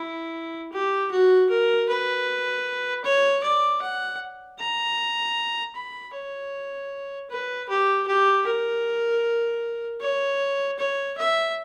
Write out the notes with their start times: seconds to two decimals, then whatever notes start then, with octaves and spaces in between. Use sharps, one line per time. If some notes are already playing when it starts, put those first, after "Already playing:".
Already playing: E4
0.72 G4
1.11 F#4
1.50 A#4
1.89 B4
3.04 C#5
3.43 D5
3.82 F#5
4.59 A#5
5.75 B5
6.14 C#5
7.30 B4
7.68 G4
8.07 G4
8.46 A#4
10.01 C#5
10.78 C#5
11.17 E5